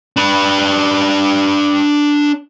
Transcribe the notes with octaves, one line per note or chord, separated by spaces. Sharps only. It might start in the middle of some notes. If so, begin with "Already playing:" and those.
D4 B4